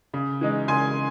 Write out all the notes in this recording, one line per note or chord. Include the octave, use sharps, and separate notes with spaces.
C#3
E3 G#3 D#4
C#3 G#5 C6